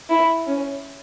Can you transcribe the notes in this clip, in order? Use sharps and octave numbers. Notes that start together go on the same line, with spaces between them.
E4
C#4